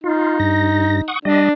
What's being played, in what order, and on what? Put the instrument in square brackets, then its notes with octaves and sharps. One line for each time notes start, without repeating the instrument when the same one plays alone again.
[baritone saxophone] D#4 [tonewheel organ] F4
[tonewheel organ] G2 A#6
F#5 C#6 D#6
[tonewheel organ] G3 D#5 [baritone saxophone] D4